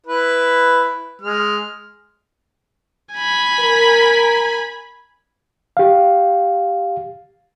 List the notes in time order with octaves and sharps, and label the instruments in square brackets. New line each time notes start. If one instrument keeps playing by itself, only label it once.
[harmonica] E4 B4
G#3 F6
[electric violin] G#5 B5
[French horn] A#4
[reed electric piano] G4 F5